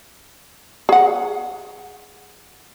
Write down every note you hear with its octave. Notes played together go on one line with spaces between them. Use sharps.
G#4 F#5